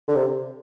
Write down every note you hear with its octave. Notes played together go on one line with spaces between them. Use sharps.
D3
C3